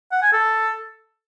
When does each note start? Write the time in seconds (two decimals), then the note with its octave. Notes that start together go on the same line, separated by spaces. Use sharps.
0.11 F#5
0.22 G#5
0.33 A4